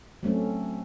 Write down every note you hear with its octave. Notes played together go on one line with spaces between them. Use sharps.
F#3 A3 C4 C#4